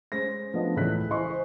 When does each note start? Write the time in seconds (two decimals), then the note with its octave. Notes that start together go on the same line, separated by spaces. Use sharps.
0.12 G#3 C#4 C5 A#6
0.54 F3 A3 B3 D4 D#5
0.76 C#2 A2 E3 A3 F#6 B6
1.10 E4 C5 D#5 G#5 C6 C#6
1.30 C5